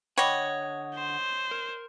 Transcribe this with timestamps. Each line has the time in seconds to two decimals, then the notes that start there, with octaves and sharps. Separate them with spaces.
0.18 D3 C#5 D#5 F#5 G5 B5 D6
0.95 C5
1.51 A#4